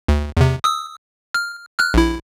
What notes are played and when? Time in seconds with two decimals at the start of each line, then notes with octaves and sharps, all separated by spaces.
0.08 D2
0.37 E2 C3
0.64 D#6 E6
1.34 F6
1.79 F6 F#6
1.94 A#1 E4